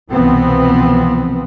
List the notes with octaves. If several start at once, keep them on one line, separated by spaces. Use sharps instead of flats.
C2 B2 E3 F3 B3 C4